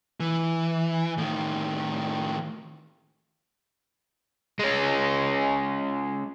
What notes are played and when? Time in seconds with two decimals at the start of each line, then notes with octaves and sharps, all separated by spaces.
0.20 E3
1.18 A2 D#3
4.59 G#3 C#4